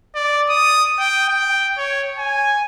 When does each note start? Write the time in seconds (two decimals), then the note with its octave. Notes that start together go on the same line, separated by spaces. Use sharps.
0.15 D5
0.49 D#6
0.99 G5
1.29 G5
1.78 C#5
2.18 G#5